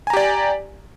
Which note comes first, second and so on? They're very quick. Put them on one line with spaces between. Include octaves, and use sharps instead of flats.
G#5 A#5 G4 D5